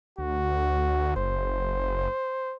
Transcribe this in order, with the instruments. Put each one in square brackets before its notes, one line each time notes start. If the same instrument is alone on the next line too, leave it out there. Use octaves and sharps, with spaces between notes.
[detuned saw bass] D2 [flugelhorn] F#4
[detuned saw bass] F#1 [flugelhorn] C5